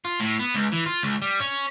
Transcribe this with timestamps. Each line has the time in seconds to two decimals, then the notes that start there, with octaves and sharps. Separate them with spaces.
0.05 F4
0.20 A2
0.40 B3
0.54 C#2
0.72 E3
0.86 F4
1.03 C#2
1.22 G3
1.40 C#4